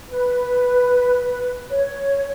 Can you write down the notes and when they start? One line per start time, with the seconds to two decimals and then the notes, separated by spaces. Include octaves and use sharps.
0.09 B4
1.70 C#5